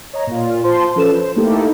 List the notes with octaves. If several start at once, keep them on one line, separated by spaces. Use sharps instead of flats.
C#5 D#5 A#5
A#2 F4
F4 C5 A5 C6
F3 C#4 A4 B4 E7
C5
A3 A#3 D#4 E4 G4 A4